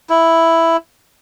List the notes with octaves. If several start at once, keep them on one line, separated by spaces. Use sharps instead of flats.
E4